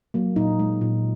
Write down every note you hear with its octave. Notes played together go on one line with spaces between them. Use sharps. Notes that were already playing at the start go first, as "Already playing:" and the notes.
F#3 A#3
A#2 D#4
G#3
A#2